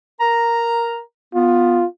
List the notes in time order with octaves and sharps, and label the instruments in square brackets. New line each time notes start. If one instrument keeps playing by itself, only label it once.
[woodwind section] A#4 A#5
[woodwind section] B3 [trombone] F4